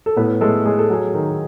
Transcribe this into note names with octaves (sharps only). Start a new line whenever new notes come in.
A4
A2 B3 B4
G#3 A3 A4
G#3 G#4
A4
F#3 G#4
D#3